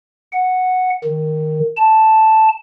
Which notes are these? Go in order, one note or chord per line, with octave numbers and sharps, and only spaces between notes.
F#5
D#3
A5